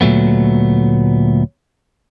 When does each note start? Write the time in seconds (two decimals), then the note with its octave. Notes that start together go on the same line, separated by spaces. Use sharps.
0.01 D2 A#2 F#3 A3 B3